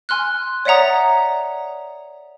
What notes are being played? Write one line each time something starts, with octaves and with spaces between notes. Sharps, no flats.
G#5 C6 F6 F#6
C#5 D5 E5 F#5 A#5 D#6